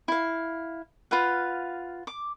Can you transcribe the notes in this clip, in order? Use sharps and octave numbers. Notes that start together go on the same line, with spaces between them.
E4 F5
F4 B4 F5 F#5
D6